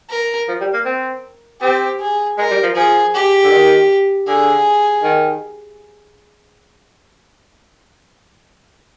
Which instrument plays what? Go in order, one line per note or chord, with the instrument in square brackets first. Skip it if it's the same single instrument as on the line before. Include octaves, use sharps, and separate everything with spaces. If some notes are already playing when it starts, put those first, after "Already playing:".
[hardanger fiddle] A#4
[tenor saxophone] F3
G3
A#3
C4
[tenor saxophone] C4 [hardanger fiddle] G4
[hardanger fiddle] G#4
[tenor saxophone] G#3 [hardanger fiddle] A#4
[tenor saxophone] G3
F3
[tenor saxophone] F3 [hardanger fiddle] G#4
[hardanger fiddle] G4
[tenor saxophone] D3
D#3
[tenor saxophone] D3 [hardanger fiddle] G#4
[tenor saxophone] D#3